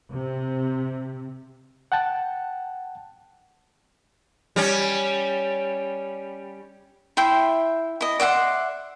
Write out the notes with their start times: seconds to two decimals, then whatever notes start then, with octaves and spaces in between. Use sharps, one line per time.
0.13 C3
1.92 F#5 G5 A5
4.56 G3 C#4
7.17 E4 E5 G5 C6
8.01 E4 D#5
8.20 D5 E5 F#5 C6